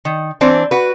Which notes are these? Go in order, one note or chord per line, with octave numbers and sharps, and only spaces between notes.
D#3
E3 C4 D4 C5
F#4 B4